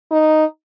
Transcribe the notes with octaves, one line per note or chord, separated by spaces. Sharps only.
D#4